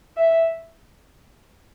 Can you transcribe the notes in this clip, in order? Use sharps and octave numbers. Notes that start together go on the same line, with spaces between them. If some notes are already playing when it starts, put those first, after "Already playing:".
E5